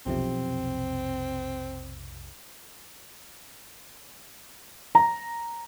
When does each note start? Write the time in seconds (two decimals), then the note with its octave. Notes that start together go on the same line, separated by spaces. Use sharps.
0.06 B1 F2 C3 C4
4.95 A#5